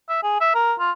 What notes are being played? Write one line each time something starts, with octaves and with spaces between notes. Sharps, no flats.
E5
G#4
E5
A#4
F4